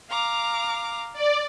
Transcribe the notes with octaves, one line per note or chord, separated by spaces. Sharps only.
F5 A#5 D6
D5